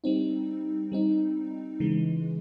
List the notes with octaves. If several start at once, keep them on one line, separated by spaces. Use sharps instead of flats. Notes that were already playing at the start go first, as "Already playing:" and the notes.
G3 C4 D#4
G3 C4 D#4
C#3 E3 G#3